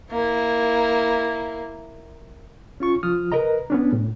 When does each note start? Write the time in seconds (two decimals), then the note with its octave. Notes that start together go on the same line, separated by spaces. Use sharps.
0.11 A#3 E4
2.80 C#4 F4 C#6
3.03 F3 F4 D#6 F6
3.32 A#4 B4 D#5 A#5
3.70 B3 C#4 D4
3.93 A2